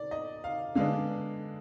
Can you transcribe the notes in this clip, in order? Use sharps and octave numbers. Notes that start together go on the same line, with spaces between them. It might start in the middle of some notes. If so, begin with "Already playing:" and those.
Already playing: D5
D#5
F5
D3 G#3 B3 D4 F5